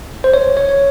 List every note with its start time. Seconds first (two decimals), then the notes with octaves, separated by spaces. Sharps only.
0.24 C5
0.34 C#5
0.57 C#5
0.69 C#5